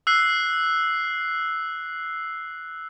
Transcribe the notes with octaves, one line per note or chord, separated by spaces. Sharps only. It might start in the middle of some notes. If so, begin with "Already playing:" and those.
E6 F#6 C7